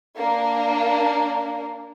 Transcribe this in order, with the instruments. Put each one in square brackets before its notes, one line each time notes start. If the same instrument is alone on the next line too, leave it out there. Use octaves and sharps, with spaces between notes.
[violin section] A#3 D4